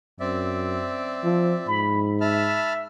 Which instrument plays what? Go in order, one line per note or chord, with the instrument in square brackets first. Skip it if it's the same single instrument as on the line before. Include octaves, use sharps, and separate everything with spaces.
[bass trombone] F#2 [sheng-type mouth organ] C4 D5 E5
[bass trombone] F3
[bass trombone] G#2 [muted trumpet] B5
[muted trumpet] E5 [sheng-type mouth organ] A5 B5 F6